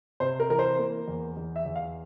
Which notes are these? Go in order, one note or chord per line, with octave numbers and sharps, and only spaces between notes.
C3 C5
A#4
E3 A#4
C5
A#3
E2
E2
E5
E2
F5